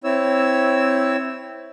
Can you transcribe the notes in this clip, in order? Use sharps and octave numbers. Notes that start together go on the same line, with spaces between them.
C4 E4 C#5 E6